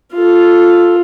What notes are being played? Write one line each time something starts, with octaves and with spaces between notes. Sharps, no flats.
F4 A4